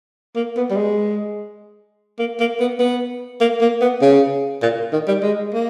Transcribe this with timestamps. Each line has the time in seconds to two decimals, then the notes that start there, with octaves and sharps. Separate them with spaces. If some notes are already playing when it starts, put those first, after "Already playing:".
0.36 A#3
0.57 B3
0.71 G3
0.76 G#3
2.19 A#3
2.40 A#3
2.60 B3
2.79 B3
3.41 A#3
3.61 A#3
3.81 B3
4.02 C#3
4.63 A#2
4.93 D#3
5.08 G3
5.23 G#3
5.54 A#3